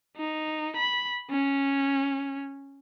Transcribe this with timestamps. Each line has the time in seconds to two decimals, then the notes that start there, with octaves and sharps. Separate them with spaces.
0.17 D#4
0.76 B5
1.31 C#4